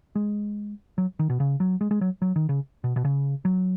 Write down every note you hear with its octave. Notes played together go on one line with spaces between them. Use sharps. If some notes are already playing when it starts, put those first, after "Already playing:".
G#3
F#3
D#3
B2
C#3
F#3
G#3
G#3
F#3
F#3
D#3
C#3
B2
B2
C#3
F#3